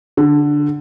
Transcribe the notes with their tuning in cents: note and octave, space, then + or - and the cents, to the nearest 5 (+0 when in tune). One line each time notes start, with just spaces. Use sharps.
D3 +0